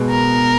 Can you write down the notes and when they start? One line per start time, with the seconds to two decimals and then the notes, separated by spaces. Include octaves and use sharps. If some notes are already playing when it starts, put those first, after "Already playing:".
Already playing: B2 G#3 B3
0.11 A#4